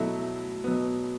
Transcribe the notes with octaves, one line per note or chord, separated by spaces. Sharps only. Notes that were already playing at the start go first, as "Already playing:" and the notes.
Already playing: B2 F#3 A3 E4
B2 F#3 B3